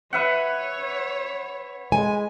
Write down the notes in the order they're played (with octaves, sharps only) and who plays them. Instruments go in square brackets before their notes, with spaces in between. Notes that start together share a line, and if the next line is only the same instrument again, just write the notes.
[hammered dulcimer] B4 E5 F#5 [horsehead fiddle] C#5
[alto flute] G#3 [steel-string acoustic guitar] G#5